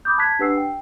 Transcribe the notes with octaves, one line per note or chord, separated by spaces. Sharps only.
B5 D6 D#6 G6
A5 F#6 G#6 B6
D4 G4 B4 F#5 E6 C7
G5